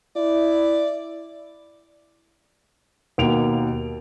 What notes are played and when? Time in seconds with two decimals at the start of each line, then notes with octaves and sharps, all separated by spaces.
0.16 E4 D5
3.18 D#2 B2 A#3 D7 F7